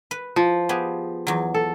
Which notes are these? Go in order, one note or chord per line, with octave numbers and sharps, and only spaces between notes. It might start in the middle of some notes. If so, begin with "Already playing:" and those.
B4
F3
B3 G4 G#4
E2 F#3
A4